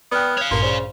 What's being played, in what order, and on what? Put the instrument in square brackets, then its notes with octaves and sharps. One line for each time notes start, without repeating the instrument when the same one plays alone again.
[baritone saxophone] B3 [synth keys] D5 G5 [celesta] D#6 F6 F#6
[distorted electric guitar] C#5 F5
[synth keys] A1 G2 A#2 [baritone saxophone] A#3 [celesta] C6
[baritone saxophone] C#3 [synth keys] C5 D5